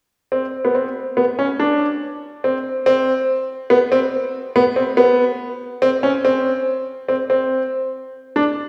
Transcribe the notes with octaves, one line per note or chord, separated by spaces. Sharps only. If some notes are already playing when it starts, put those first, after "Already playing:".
C4
B3
C4
B3
C#4
D4
C4
C4
B3
C4
B3
C4
B3
C4
C#4
C4
C4
C4
D4